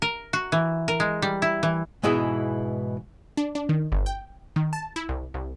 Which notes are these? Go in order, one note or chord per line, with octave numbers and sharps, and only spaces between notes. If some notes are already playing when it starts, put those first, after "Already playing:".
A#4
F#4
E3
A#4
G#3
G3
E4
E3
G#2 B2 E3 E4 G#4
D4
D4
D#3
G1
G5
D#3
A5
E4
C2
C2